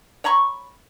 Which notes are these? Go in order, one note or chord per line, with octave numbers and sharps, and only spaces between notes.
C#5 A#5 B5 C#6